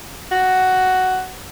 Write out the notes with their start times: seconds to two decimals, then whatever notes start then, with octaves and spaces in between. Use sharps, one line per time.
0.31 F#4